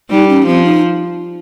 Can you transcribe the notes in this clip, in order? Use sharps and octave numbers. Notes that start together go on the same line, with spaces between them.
G3 D#4
C#4
F3 C4
D#4